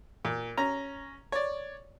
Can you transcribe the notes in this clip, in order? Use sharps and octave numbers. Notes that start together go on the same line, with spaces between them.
A#2
C#4 A#5
C#5 D5